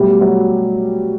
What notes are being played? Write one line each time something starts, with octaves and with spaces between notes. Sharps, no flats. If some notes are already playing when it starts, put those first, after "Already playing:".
Already playing: B2 F#3 G3 A3 G4
F#3 F#4